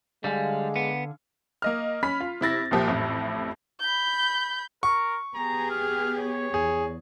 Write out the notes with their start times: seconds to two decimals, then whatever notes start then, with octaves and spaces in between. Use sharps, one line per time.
0.24 D3 G3 G#3 F5 G#5
0.76 B3
1.62 A#3 D#5 F6
2.03 C#4 B5 F6 B6
2.20 F4
2.41 C3 E4 A6 A#6
2.71 C2 A#2 F3 G4
2.87 A1 F2 A2
3.81 B5 G6
4.83 A#4 C#6
5.35 B3 G4 G#4 A#5
5.70 F6
6.18 C#5
6.54 E2 G#4